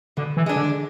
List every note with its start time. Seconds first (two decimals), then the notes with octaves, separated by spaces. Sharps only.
0.17 B2 D3
0.37 E3
0.46 G#3 D4
0.56 D3